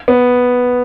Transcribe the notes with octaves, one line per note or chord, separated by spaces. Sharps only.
B3